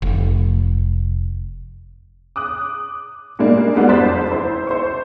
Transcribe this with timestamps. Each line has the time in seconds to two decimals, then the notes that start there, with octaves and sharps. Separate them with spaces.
0.02 F1
2.36 D6 D#6 F#6
3.39 A#2 G3 G#3 A#3 D4
3.75 G#2 G3 G#3 B3 D4 F#4
3.88 F#1 F2 C5 D5 A6 B6
4.32 E4 C5
4.67 C5 C#6